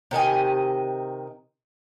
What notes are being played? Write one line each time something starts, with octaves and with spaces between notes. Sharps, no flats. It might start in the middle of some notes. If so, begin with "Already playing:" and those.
C3 D#3 D#5 G#5